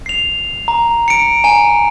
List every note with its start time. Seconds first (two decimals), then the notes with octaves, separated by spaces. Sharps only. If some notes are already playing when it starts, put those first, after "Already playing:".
0.06 C7 F7
0.68 A#5
1.08 C#7 D7
1.44 G#5 A#5